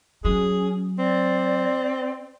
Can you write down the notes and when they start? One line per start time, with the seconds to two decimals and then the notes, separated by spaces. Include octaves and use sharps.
0.25 F#3 C#4 G#4
0.99 C4 D5